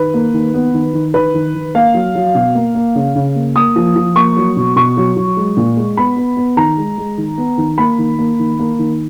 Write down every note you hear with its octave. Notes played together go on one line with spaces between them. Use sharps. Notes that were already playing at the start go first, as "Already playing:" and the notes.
Already playing: D#3 B4
A#3
D#3
B3
D#3
D#3
D#3 B4
D#3
D#3
A#3 F5
F#3
F#3
B2
A#3
A#3
C#3
C#3
A#3
A#3 D#6
F3
F3
A#3 C#6
F#3
B2
B2 C#6
F#3
F#3
G#3
A#2
G#3
B3 B5
B3
B3
D#3 A#5
G#3
G#3
D#3
B3
D#3
A#3 B5
D#3
A#3
D#3
A#3
D#3